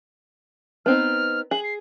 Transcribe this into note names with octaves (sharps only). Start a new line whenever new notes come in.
B3 C4 D#4 F6
G#4 F#7
C7